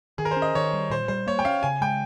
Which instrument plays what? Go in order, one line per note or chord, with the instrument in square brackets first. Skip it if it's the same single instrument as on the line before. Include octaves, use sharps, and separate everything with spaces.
[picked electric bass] D#3 [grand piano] G#4
[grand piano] A#4
C5
[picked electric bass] C#4
[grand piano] D#5
[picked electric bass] D#3 [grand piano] C#5
[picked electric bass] G3
[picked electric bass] A#2 [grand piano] C5
[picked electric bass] G3 [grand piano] C5
[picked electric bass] A#3 [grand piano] C#5
[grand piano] G5
[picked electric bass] C#4 [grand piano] F5
[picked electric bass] C#3 [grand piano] G#5
[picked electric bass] G#3 [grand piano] G5